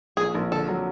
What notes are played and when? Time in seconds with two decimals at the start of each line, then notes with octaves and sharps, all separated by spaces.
0.17 A#1 G#4
0.35 A#1
0.52 D3 A4
0.68 F#3